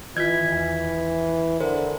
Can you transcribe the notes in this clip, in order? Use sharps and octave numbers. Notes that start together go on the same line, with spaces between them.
D#3 E3 F4 G#6 B6
E2
D3 A#4 C5